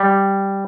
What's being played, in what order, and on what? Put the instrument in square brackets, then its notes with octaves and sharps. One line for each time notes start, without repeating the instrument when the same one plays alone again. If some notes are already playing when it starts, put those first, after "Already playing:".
Already playing: [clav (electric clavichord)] G3